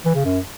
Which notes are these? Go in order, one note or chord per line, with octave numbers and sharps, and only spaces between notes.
E3
C#3
F#2